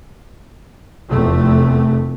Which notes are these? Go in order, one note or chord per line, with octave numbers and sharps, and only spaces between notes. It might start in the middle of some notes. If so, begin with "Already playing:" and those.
F1 E2 C3 A3